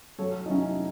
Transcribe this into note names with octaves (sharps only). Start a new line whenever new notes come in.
F#3 A4 C#5
D#4
F#3 C#4 E4